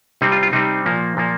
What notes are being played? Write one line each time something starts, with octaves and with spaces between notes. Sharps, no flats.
C3 G3 C4 D#4
F4
F4
C3 G3 C4 D#4
A#2 F3 A#3
A#2 F3 A#3